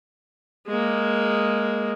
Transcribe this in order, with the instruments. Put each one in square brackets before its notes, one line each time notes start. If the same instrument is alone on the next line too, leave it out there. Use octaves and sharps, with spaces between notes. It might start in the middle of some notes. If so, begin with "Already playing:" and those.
[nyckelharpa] G#3 A#3